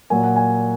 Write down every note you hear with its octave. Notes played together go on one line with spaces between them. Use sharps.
A#2 F#3 A#3 G#5
F#5
G#5